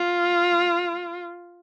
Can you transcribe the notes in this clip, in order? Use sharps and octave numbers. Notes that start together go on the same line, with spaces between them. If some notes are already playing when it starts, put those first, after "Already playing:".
Already playing: F4